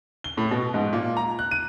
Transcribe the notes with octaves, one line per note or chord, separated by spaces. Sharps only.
G7
A2
B2
G#2
A#2
A#5
F#6
D#7